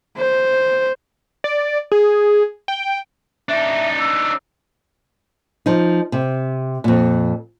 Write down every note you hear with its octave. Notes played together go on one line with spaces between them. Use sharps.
C5
D5
G#4
G5
D4 D#4 E5
E6
F3 D#4
C3
F2 A#2